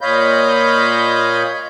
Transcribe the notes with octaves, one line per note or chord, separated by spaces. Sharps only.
A#2 C#5 D#5 F5 B5 G6